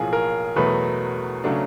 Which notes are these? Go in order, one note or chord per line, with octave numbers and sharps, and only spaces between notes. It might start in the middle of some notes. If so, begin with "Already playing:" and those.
Already playing: B1 A2 F3 A#3 G#4
A#4
E2 B2 F#3 A3 B4
C#3 F#3 A3 D4